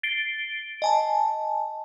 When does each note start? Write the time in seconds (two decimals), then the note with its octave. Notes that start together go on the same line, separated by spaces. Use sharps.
0.03 A6 C7 D7 G7
0.82 D#5 G#5 A5